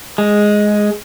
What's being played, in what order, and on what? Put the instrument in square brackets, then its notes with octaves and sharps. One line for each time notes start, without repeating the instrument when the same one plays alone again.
[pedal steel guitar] G#3